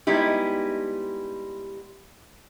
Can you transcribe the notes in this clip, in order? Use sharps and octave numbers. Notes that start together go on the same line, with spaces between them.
G3 G#3 B3 D#4 E4 G4